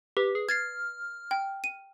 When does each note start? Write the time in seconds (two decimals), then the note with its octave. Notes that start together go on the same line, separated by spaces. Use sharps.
0.17 G4 B4
0.35 G#4
0.49 F6 G#6 A6 C7
1.31 G5
1.64 D#7